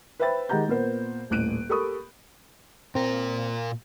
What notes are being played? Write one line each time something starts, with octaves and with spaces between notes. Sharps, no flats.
B4 C5 E5 G5 B5 A6
D#3 G#3 G4 F#5 A#5 G6
A#2 B3 A#4 C5
D#1 A1 F#6 D7 D#7
G4 A4 A#4 B5 C#6 D#6
A#2 C4 A#4